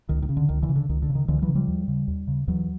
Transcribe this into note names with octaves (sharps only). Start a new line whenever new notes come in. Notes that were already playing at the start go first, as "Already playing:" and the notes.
C#2 D#3
D#3
C#3
D3
C#2 D#3
D3 E3
C#3
D3
C#2 D#3
D3
C#3
D#3
C#2 D3 E3
E3 F#3
C#3
F3 G3
D#2
C#3
D#2
C#3
D#2 E3 F#3